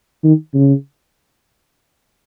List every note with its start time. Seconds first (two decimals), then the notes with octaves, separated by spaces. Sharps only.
0.24 D#3
0.54 C#3